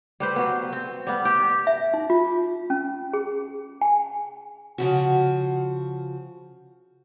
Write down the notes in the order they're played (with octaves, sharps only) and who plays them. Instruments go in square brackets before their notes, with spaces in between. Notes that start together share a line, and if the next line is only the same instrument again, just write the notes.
[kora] G3 B4 C5
F#3 B3
C4
G3 B3
G4
[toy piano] E5
D#4
F4
C#4
G#4
G#5
[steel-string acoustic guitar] C#3 F3 F#4